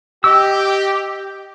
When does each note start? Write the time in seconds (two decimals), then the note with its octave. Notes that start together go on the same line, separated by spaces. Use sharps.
0.24 G4 D#5 E6